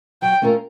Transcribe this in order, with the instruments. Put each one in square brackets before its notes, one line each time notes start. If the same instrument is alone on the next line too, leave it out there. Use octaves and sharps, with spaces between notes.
[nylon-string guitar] F#3 [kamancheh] G5
[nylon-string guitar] A3 C#4 F4 A#4